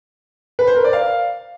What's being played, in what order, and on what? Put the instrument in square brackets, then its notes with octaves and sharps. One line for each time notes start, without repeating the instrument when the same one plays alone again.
[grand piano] B4
C5
A#4
D5
F5